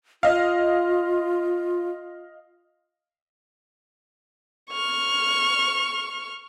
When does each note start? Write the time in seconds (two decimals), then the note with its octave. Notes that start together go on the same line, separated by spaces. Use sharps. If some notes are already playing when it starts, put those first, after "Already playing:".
0.23 F4 D#5 F5
4.71 C#6 F6